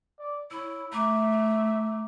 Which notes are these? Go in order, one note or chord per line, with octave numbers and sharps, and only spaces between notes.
D5
E4 C#5 E6
A3 E5 A#5 D6